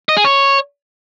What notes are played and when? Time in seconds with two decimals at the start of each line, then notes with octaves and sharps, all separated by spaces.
0.09 D#5
0.17 G#4
0.25 C#5